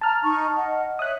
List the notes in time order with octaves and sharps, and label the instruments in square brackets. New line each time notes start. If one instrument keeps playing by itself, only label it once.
[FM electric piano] A5 F6 [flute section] A#5
[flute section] D#4 C#6
D#5 F#5
[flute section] C#5 E5 [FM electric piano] D#6 F#6